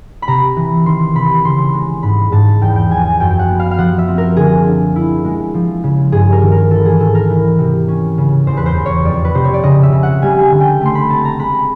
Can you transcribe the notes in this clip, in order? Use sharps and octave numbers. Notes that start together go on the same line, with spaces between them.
B5
C3 A#5
E3
D#3 C6
C3 B5
C#3 C6
G#3
G#2 B5
G#2 A5
E2 G5
G5
F3 G#5
G#5
F#2 G5
G5
F#5
B3
F5
F5
F3 F#5
E5
C4
A#4
D3 G#4
D4
E4
G#3
F3
C#3
G2 G#4
A#4
D#3
A#4
E3 A4
G#4
G#2 A4
A#4
E3
C3
C#4
C#3
E2 C5
B4
C5
E2
C#5
F2 D5
B4
C3 C5
C#5
D5
C#3 D#5
E5
C#3
F#5
G3 G#5
G#5
D3
G5
A3 C6
B5
C4 A5
A#5
G#3 B5